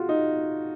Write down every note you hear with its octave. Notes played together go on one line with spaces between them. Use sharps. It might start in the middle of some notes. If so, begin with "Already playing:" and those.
Already playing: F4 F#4 G#4
D#4